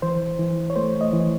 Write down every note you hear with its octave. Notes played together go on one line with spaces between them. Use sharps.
E3 C5
E3
C#5
A3 C5
D#5
E3